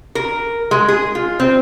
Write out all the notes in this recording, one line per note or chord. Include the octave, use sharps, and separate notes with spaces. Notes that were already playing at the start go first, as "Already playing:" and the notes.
A#4
G#3
G#4
F4
C4